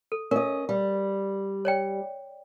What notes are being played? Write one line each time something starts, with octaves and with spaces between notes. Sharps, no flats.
A4
C#4 A#4 D#5
G3
C#5 D5 G5